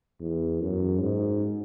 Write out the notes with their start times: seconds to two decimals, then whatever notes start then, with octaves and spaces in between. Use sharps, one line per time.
0.20 E2
0.61 F#2
1.01 G#2